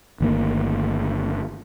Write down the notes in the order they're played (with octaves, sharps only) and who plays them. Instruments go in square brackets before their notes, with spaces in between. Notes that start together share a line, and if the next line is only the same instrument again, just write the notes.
[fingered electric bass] G1 D#3 A3 A#3